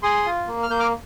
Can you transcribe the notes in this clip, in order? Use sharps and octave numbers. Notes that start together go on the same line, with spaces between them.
G#4 C6 D#6
F4
A#3
F6
A#3 G6
D6 F6